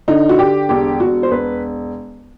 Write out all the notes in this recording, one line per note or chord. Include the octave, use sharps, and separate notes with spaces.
D3 D#4
F#4
D3 G4
E1 G4
E1 F#4
C5
E1 B4